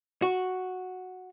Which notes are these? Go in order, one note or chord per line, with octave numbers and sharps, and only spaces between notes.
F#4